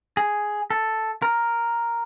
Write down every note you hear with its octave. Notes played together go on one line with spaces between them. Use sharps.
G#4
A4
A#4